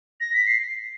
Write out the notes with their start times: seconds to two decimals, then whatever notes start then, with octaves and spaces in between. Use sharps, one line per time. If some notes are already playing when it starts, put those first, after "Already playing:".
0.20 A#6
0.34 B6
0.47 C7